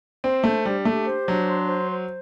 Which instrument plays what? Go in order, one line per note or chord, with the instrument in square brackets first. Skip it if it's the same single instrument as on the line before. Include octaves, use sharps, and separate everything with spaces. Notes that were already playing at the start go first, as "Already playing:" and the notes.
[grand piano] C4 [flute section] C5
[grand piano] A3 [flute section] D4
[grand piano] G3 [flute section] D4
[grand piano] A3 [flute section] G4
[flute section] C5
[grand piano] F#3 [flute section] D4
[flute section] C6
C5
C5